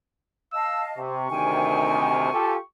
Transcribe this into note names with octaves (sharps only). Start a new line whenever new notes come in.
D#5 F5 A5 E6
C3 C#6
D2 C3 D#3 G5 G#5
F4 G4 A4